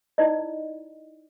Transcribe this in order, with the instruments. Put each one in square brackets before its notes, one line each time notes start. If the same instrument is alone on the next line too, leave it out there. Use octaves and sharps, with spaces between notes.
[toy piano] D#4 E4 D5 D#5